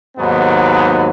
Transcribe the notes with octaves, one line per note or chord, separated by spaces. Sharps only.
D#2 G#2 F#3 B3